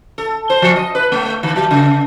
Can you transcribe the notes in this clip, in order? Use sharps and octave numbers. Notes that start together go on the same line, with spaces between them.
A4
C5
F3
D#5
B4
A3
D#3
F#3
C#3